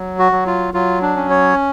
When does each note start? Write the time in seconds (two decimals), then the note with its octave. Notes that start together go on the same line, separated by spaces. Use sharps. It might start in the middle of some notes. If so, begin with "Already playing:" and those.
Already playing: F#3
0.19 F#4
0.32 F#3
0.47 F4
0.74 F#3 F4
1.02 D4
1.16 C#4
1.30 C#5